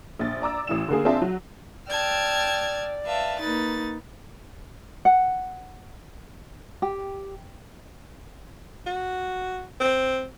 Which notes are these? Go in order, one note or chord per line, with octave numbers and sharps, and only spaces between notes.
A#1 A6
D5 A#5 D6 E6
A1 E3 E7
D3 A#3 G#4
C4 D4 F4 G#4 E5 A5
F#3
D5 G5 A5 E6 F6 G#6
B4 E5 F5 A5
A#3 D#4 B4 A6
F#5
G4
F#4
C4